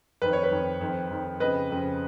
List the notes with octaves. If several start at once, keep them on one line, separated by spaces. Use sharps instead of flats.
F2 D#3 B4
C#5
B4
F2 D#3
F2 D#3
F2 D#3
F2 C#3 B4 D#5
F2 C#3